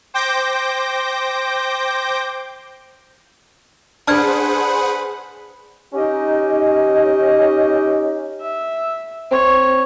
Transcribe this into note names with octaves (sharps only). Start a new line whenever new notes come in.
C5 G5 D6 G6 A#6
D4 G#4 B4 C5 F#5 A5 F6 G#6
C#4 D#4 G4 D#5
E5
C4 C#5